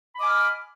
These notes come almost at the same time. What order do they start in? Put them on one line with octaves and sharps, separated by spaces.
B5 D#5 D6 G#5 F6